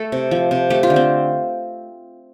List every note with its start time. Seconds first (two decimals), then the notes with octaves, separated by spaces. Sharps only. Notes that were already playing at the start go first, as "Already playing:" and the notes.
Already playing: A3 A4
0.12 C3
0.31 F3
0.51 C3
0.70 A3 G4
0.83 F4
0.90 D3
0.96 C4